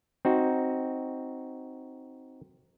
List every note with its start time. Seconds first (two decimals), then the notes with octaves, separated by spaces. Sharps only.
0.25 C4 D#4 F#4